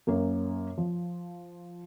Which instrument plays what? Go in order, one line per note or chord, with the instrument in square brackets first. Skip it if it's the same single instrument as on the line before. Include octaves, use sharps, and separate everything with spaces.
[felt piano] F#2 A#3 C#4
F3